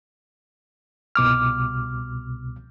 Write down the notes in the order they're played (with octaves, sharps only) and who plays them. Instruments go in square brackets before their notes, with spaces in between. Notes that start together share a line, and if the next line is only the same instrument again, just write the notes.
[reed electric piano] C2 B2 D6 F6